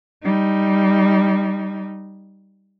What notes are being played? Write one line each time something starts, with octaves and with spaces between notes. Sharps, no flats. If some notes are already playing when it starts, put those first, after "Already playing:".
G3 D#4